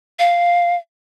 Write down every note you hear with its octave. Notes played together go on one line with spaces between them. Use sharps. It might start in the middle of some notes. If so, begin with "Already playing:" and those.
F5